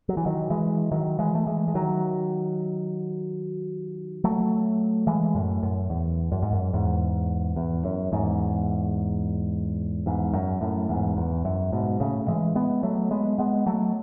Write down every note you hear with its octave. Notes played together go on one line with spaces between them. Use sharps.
F#3
E3
D#3 F#3
E3 G#3
D#3 F#3
E3 G#3
A3
E3 G#3
G#3
D#3 F#3
F#3 A3
E3 G#3
F#2 A2
F#2
E2
F#2
G#2
F#2
E2 G#2
E2
F#2
E2 G#2
E2 G#2
F#2
F#2 A2
E2 G#2
E2
F#2
G#2 B2
A2 C#3
E3 G#3
G#3 B3
F#3 A3
G#3 B3
G#3 B3
F#3 A3